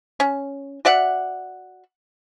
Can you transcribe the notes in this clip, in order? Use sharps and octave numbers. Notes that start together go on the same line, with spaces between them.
C#4
F#4 D5 E5 F#5